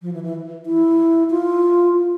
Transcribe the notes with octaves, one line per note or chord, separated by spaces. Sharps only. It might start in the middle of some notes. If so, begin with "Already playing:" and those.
F3
E3
E3
E4
F4